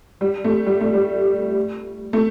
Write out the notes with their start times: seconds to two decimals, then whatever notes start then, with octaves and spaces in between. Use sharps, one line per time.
0.21 G3
0.44 A3
0.66 G3
0.81 A3
0.94 G3
2.13 A3